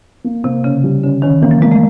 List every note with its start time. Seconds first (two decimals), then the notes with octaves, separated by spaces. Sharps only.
0.24 A#3
0.44 C3 A#3
0.64 C#3 C#4
0.84 G3
1.03 D3 C#4
1.22 D#3 C#4
1.42 E3 A#3
1.51 F#3
1.62 G#3 A#3
1.71 A3